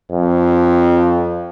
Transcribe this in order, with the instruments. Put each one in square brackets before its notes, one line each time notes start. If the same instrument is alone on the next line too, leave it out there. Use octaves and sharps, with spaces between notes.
[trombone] F2